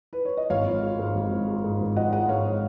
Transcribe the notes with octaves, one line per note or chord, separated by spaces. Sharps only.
B4
C#5
D#5
G#1 C#5 F5
F3
G#3
G#2
G#1
F3
G#3
G#2
G#1
F3 D#5 F#5
G#3 D#5 F#5
G#2 C#5 F5